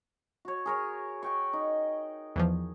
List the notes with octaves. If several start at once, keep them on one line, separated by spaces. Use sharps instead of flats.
F#4 C#5
G#4 A#4 C#5
F#5 G5 C#6
D#4
E2 E3 F3